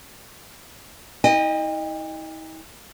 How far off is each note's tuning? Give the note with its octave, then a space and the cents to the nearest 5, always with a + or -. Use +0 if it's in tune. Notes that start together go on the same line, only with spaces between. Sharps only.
D#4 +45 D#5 -15 G5 +40